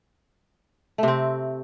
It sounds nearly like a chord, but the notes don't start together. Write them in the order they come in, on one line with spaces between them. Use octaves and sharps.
A3 C3 C4